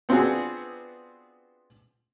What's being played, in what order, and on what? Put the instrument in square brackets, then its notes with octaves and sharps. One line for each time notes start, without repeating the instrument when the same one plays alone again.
[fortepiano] B3 C4 D4 F4 F#4 G#4